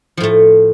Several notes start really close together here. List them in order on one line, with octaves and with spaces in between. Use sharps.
F3 A2 A3